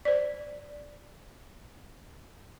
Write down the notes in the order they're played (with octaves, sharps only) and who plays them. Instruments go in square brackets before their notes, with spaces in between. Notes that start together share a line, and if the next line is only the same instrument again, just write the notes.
[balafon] C5 D5